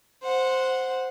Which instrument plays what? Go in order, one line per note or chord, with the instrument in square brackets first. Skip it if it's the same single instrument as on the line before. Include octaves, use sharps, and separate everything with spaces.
[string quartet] C5 F#5